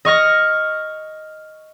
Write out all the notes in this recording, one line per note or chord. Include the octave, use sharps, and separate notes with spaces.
D#5 C#6 F6 A#6